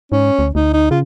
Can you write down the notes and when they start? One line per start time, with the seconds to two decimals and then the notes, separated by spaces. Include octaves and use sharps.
0.12 G#2 C#4
0.39 D2
0.55 D2 D#4
0.73 D#4
0.91 C#3 F4